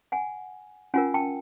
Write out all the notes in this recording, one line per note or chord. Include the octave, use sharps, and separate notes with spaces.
F#5 G#5
C#4 F4 A#4 F#5 G#5
G5 A5